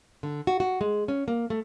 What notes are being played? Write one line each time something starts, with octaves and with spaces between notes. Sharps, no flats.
D3
F#4
F#4
G#3
C#4
A#3
A3